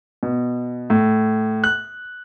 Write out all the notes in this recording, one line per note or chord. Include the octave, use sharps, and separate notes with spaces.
B2
A2
F#6